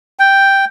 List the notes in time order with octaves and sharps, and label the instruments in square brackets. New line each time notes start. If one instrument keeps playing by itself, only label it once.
[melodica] G5